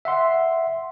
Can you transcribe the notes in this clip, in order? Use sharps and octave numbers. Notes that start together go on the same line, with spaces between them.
E5 F#5 C6